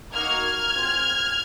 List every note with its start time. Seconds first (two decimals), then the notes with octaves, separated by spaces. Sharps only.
0.15 A#3 D#4 F#4 F6 G#6
0.75 C4 F4 G#4